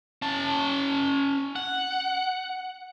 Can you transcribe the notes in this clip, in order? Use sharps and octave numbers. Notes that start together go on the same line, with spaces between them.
C#4 A5
F#5